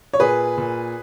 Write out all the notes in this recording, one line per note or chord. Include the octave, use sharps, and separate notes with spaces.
C#5
A#2 G#4 B4
A#2